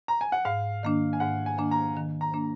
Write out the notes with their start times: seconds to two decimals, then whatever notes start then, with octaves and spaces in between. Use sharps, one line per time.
0.08 A#5
0.21 G#5
0.32 F#5
0.45 G#2 F5
0.83 D#3 A#3 D4
1.13 G#5
1.20 G#2 F#5
1.46 G#5
1.58 D#3 A#3 D4
1.71 A#5
1.96 D#3
2.21 A#5
2.34 A#3 D4